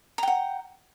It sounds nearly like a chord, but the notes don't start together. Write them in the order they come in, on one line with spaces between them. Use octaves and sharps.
A#5 G5 F#5